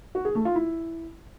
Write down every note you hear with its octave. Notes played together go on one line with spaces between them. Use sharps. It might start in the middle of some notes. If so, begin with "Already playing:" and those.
F#4
G#4
A3
F4
E4